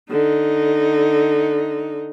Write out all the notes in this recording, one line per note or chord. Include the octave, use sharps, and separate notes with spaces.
D3 D#4